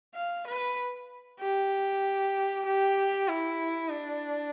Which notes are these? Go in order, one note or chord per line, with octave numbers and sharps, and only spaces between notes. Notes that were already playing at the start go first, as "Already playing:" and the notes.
F5
B4
G4
G4
E4
D4